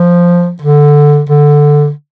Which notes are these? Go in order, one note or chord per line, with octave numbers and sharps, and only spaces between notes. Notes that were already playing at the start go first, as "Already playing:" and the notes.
Already playing: F3
D3
D3